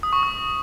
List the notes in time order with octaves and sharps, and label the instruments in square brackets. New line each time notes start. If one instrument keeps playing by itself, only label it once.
[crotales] D#6
C#6
D#6